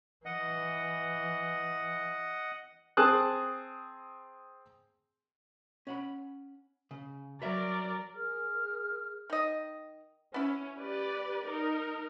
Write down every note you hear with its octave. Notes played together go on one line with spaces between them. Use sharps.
E3 D#5 F#5
C4 G#4 A5 D#6 F#6
C#4 F#5 B5
C#3
F#3 A#4 B4 C#5 D5 E5
G#4 A#4 F6
D#3 D#5
B3 C#4 E4
G4 B4 D5
D#4 A#4